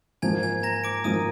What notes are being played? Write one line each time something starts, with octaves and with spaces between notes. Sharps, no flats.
G#2 F3 A#3 G#5 G#6
G#5 G#6
A#5 A#6
D6 D7
G#2 F3 A#3 D#6 D#7